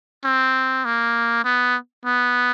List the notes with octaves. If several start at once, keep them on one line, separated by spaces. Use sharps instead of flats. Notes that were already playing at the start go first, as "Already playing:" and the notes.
C4
A#3
B3
B3